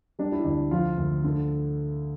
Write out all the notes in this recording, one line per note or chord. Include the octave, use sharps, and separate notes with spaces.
G3 D4
E4
D2 D4
F3 F4
D2
D3